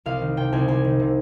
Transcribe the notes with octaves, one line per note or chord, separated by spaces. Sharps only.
C2 F5
D#3
C3 G5
C2 G#5
C2 G#5
D#3
C3